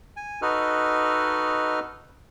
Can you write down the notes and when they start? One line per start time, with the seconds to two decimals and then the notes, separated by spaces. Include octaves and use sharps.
0.17 G#5
0.42 D#4 F#4 A4 B4 D#5 F6